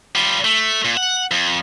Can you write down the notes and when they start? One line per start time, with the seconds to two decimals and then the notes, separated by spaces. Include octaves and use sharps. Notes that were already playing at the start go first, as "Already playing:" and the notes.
0.15 G3 F4
0.44 A3
0.85 A#2
0.97 F#5
1.31 F2